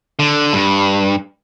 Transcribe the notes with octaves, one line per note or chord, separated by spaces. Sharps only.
D3
G2